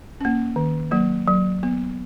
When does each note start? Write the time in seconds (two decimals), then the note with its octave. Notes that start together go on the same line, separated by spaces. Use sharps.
0.21 A#3 C#4
0.56 D#3
0.91 F#3 A#3
1.27 F#3
1.63 B3